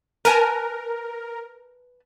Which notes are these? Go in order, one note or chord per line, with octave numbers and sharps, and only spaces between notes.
A#4 B4 G#5 A5